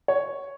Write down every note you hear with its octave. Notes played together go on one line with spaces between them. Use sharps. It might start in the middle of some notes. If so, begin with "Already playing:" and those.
C#5